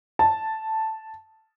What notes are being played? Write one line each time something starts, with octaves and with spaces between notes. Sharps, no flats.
A5